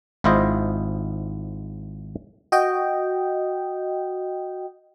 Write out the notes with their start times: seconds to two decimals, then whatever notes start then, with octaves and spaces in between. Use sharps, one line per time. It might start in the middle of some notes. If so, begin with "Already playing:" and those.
0.24 G#1 G#2 E4 F4 C5 D#5
2.52 F#4 D#5 G5